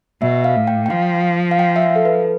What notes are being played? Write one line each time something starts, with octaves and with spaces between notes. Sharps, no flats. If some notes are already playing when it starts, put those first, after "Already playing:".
B2 E5
F5
A2
G5
G5
F3 F5
F5
G5
E5
F5
A4
B4